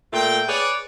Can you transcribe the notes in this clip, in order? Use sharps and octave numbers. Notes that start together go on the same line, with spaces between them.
A#2 A3 G5
G#4 B4 C#5 D5